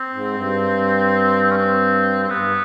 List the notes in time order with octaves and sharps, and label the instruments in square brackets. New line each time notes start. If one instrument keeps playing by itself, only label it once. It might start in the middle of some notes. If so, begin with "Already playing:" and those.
Already playing: [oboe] C4
[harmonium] G#2
G2
[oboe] C4
C#4
C4
[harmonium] F#2 [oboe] C4
[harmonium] G2 [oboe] B3